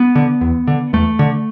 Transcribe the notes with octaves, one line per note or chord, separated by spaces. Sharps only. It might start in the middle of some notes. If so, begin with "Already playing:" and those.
Already playing: B3
D3
E2
D3
E2 A3
D3